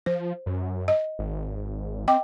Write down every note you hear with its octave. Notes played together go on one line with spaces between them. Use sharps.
F3 C5
F#2
D#5
G#1
C4 D#5 G5 D6